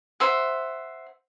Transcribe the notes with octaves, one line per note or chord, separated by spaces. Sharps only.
C5 E5 F#5